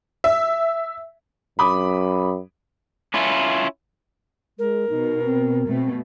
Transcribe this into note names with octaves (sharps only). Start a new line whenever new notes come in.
E5
F#2 B5 D6 D#6
C#4 E4 F4
G#3 A#4
B2 D#4
C4
B2 A3 C4